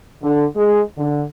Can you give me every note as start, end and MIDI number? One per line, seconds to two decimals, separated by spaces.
0.23 0.45 50
0.56 0.81 56
0.98 1.24 50